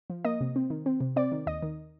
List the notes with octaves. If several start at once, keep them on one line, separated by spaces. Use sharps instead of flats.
F3
A#3 D#5
C3
C4
D#3
C4
C3
C4 D5
D#3
D#2 D#5
D#3